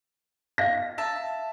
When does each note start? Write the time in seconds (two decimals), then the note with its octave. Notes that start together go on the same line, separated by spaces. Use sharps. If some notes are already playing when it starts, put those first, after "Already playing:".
0.58 F5 A#6
0.98 E5 A5